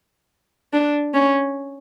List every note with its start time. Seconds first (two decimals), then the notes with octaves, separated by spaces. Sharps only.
0.73 D4
1.14 C#4